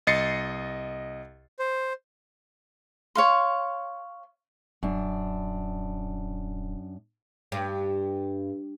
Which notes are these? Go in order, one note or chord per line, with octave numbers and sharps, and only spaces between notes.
C2 D#5 A6 C7 C#7
C5
C#5 F5 C6
D#1 F#2 D4
G2